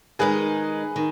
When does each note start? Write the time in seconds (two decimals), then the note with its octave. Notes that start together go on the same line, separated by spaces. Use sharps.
0.19 D#3 G#3 D#4 G#4 B4
0.96 D#3